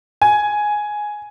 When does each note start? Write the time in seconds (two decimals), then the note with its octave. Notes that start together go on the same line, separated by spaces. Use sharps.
0.22 G#5